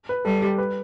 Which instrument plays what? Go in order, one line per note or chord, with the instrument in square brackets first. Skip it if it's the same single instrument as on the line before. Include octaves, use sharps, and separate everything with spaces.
[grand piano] B4
[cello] G3 [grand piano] A4
[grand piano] G4
B4